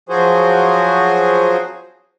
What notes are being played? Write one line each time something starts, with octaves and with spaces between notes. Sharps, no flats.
F3 F#3 F#4 G#4 C5